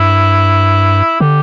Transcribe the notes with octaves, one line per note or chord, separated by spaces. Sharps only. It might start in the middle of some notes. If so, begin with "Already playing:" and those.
Already playing: G2 E4
D3 G4